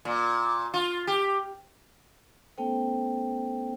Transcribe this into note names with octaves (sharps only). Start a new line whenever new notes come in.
A#2
F4
G4
A3 B3 C#4 A4 C5 G5